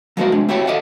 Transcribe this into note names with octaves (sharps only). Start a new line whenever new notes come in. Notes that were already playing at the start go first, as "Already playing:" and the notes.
F#3 G#3 A#3 F#4 A#4 C5
C3 G#3 D4
C4 E4 F#4 G4 C#5 G5
A4 D5 D#5 F5 F#5